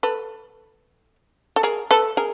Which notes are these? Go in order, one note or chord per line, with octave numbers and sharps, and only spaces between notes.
A4 B4
A4
G#4 A#4
A4 B4
G#4 A#4